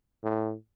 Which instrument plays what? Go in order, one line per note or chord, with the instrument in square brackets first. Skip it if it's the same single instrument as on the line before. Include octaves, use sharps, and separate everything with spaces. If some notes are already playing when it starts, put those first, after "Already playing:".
[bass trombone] A2